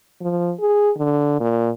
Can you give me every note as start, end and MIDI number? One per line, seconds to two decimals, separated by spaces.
0.21 0.52 53
0.60 0.91 68
0.97 1.40 50
1.40 1.70 46